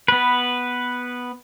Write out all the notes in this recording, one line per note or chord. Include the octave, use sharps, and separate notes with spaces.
B3 B4